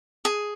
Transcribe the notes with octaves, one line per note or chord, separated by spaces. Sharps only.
G#4